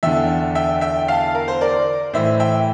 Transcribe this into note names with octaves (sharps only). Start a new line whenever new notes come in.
E2 D3 E5 G5
E5 G5
E5 G5
F5 A5
A#4
C5
A#4 D5
A2 E3 C5 E5
E5 G5